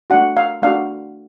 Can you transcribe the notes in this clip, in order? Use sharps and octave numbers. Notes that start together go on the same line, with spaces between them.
A3 D4 F#4 F#5
F5
A3 D4 F#4 F5